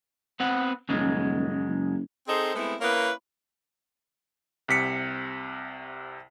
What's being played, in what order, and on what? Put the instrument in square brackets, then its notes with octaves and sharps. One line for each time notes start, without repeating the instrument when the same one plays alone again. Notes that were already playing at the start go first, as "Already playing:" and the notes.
[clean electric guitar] B3 C4 F#5
[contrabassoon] D#1 [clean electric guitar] F#2 C#3 G#3
[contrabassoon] F#1
[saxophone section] C4 D#4 G#4 A4 C5
G#3 A3 B3 C4 E4
A#3 C#4 E4 A#4 B4
[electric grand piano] C2 C3 B6 C#7